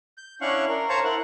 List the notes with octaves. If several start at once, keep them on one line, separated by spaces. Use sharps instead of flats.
G6
C#4 D4 E4 F5 F#5 C#6
A#4
C5 C#5 F5 A5 A#5 C#6
E4 A#4 F#5